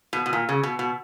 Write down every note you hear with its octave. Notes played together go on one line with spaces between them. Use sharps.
B2
B2
A#2
C#3
B2
B2